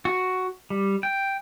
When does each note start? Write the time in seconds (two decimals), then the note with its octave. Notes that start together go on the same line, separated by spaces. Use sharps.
0.05 F#4
0.70 G3
1.03 G5